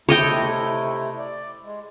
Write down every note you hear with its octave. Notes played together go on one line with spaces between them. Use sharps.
C3 A3 E4 C#5 D#5 G5
D5
G#3